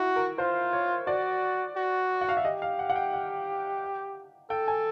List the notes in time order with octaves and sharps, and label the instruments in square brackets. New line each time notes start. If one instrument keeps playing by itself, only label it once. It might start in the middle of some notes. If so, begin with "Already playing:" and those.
Already playing: [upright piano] E4 [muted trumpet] F#4
[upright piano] A#4
[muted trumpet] F4 [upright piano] C5
[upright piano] C#5
[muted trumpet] F#4 [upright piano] D5
[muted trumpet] F#4
[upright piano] F#5
F5
E5
[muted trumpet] G4 [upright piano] D#5
[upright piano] F5
F#5
F#5
G5
F#5
[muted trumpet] A4 [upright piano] G5
[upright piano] G#5